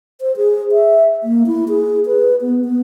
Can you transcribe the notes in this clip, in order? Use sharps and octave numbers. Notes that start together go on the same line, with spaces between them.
C5
G#4
E5
A#3
E4
G#4
B4
B3
B3